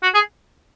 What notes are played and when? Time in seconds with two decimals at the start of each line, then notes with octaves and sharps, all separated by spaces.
0.03 F#4
0.14 G#4